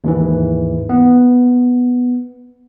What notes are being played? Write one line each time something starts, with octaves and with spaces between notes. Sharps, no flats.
D#2 G#2 E3
B3